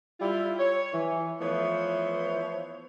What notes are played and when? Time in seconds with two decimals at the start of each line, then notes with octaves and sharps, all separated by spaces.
0.20 G3 E4 F4
0.59 C#5
0.93 E3
1.40 E3 F3 A3 B3 C5 C#5